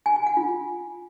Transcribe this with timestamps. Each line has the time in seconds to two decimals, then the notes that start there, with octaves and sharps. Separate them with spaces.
0.06 G#5
0.16 G#5
0.26 F#5
0.37 F4